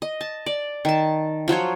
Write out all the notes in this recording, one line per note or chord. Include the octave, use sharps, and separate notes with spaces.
D#5
A5
D5
D#3 A5
F3 F#3 F4 C#5